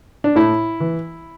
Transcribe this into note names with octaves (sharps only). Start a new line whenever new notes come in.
D4
A2 E4
E3